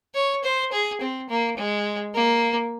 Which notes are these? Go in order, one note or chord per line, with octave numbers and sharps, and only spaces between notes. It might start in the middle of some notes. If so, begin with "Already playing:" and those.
C#5
C5
G#4
C4
A#3
G#3
A#3